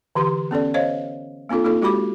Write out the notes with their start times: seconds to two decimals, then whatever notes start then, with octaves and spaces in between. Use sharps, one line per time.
0.15 D3 E3 G4 C6
0.51 B3 C#4 A4 D5
0.74 C5 C#5 D#5 F5
1.49 A#3 C4 D4 F4 A4
1.64 A#3 D#4 F4 A4
1.82 G#3 F#4 G4 B5 D6